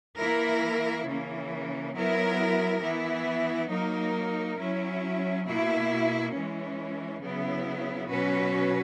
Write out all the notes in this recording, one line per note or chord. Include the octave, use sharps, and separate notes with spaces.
E3 A#3 E4 A#4
C#3 E3 A#3 C#4
F#3 B3 E4 A#4
E3 B3 E4
F#3 A#3 D#4 A#4
F#3 C#4 E4
B2 A#3 E4
E3 G#3 C#4
C#3 F#3 B3 E4
B2 F#3 C#4 F#4 B4